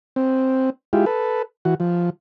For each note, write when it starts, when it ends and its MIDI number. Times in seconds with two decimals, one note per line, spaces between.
0.16 0.70 60
0.93 1.05 56
0.93 1.05 64
0.93 1.05 65
0.93 1.05 67
1.06 1.42 69
1.06 1.42 71
1.65 1.75 52
1.65 1.75 66
1.80 2.10 53